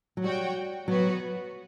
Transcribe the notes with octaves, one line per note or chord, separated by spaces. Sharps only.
F#3
G3 F#4 C#5 G5
F#3 B3 F#4 B4